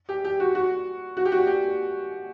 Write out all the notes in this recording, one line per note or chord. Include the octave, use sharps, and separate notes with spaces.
G4
G4
F#4
F#4
F#4
G4
F#4
G4